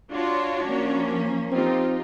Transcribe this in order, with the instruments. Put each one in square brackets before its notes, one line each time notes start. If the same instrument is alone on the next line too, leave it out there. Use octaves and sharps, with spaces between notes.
[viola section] D4 F#4 C#5 [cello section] F4
[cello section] F3 A#3 C#4
[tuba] C4 [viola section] D#4 F4 G4